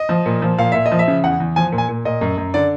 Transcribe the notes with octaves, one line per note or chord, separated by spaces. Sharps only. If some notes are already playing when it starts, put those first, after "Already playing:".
Already playing: D#5
F3
A#2
F3
A#2 F5
A#2 E5
D#5
F3
E5
C#3
E2 F#5
E2
F3 G#5
A#2
G#5
A#2
A#2 D#5
F#2
F#2
D3 D5